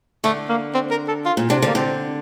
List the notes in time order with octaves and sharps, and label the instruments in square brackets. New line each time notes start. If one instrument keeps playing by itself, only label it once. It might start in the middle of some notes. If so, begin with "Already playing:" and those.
[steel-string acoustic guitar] D3 [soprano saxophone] A3
[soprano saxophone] A#3
C4
A#4
A4
F4
[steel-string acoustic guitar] A#2
[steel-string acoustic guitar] C3 [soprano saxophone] D4
[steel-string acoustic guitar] D3
[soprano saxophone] A#3
[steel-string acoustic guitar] D3 [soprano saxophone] C4